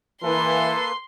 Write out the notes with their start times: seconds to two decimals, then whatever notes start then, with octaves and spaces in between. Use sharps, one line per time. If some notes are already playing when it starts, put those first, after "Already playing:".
0.23 E3 A#3 A4 B4 C6